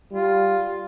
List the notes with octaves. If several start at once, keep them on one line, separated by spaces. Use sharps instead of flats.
G3 F4